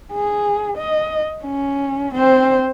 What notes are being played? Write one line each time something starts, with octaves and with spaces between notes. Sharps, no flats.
G#4
D#5
C#4
C4 C5